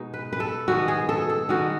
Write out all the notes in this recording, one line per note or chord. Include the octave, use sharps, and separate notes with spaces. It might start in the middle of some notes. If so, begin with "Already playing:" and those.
Already playing: B2 G#3 D#4
B4
B4
A4
D#3 G#3 B3 F#4
G#4
A4
A4
D#3 G#3 B3 F#4